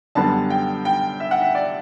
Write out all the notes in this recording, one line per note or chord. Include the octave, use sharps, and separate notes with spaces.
F#2 D3 G3 B3 A5
G5
G5
E5
F#5
E5
D5